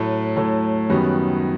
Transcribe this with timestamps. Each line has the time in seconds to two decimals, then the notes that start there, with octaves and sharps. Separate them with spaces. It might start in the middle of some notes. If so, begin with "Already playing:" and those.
Already playing: A2 F#3 A3
0.37 A2 F#3 A3
0.90 F#2 D#3 G3 B3 F#4